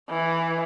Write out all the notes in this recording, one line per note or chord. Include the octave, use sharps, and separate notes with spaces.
E3